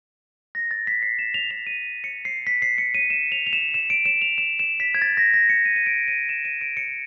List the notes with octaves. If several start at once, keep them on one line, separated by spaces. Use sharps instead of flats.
A#6
A6
B6
C7
E7
F7
F7
D#7
C#7
C7
B6
C7
C#7
D#7
E7
F7
F7
E7
E7
D7
E7
F7
E7
E7
B6
G#6
A6
A#6
A#6
C#7
D#7
D#7
D7
D#7
E7
D#7
D7
C#7